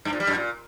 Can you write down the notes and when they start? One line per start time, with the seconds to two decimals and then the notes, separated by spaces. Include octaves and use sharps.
0.05 G2
0.13 A#2
0.20 G3
0.27 F#2
0.35 A#2